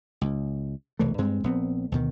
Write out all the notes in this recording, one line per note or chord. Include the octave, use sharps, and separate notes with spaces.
C#2
E1 C2 E3 A3
G2 G#3 C4
A#1 B3 C4
D2 B2 D#3